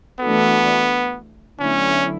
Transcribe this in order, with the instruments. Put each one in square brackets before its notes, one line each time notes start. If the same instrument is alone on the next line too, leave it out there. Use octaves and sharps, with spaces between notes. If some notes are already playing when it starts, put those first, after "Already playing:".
[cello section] E3 A3 D4 F#4 A4 [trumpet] B3
[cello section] D2 D3 F#3 B3 E4 [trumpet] C#4